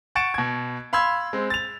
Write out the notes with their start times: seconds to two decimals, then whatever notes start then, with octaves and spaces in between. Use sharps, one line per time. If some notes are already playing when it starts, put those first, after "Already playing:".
0.15 F#5 C#6 A6 C#7 D7 E7
0.34 B2 G#6
0.93 F5 B5 C6 E6 G#6
1.33 G#3 C4
1.50 A6 F7